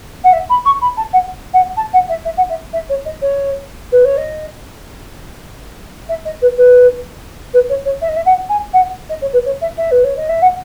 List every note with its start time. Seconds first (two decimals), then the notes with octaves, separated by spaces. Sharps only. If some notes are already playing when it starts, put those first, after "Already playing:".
0.24 F#5
0.33 E5
0.50 B5
0.65 C#6
0.81 B5
0.97 A5
1.13 F#5
1.53 F#5
1.77 A5
1.93 F#5
2.09 E5
2.25 E5
2.37 F#5
2.49 E5
2.73 E5
2.89 C#5
3.05 D#5
3.22 C#5
3.92 B4
4.05 C#5
4.17 D#5
6.09 E5
6.25 D#5
6.42 B4
6.58 B4
7.54 B4
7.69 C#5
7.85 C#5
8.01 E5
8.09 D#5
8.16 E5
8.26 F#5
8.49 G#5
8.73 F#5
9.10 D#5
9.21 C#5
9.33 B4
9.46 C#5
9.62 E5
9.78 E5
9.91 B4
10.04 C#5
10.17 D#5
10.29 E5
10.42 F#5